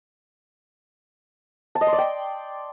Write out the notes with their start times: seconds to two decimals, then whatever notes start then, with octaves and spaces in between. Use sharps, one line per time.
1.75 A5
1.81 D#5
1.87 C6
1.93 D5
1.98 G5